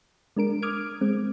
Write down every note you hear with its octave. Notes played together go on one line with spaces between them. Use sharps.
G#3 D4 A#4 D7
D6 D#6 F6 G#6 D7
G#3 C4